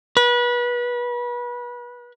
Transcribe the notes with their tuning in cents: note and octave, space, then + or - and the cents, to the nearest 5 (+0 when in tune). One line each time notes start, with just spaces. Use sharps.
B4 -30